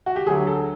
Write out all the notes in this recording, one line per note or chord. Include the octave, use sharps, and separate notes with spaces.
F#4
G4
D2 D3 F#3 G#4
A4